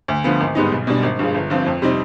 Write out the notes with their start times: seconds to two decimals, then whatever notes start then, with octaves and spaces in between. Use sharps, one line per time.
0.08 D2
0.24 D3 F3 B3
0.40 G#1
0.55 G#2 G3 B3 D#4
0.72 B1
0.87 B2 G3 D4
1.03 G#1
1.19 G2 F3 G#3
1.34 G1
1.50 G2 F3 C4
1.66 F2
1.82 C3 G3 C4 D#4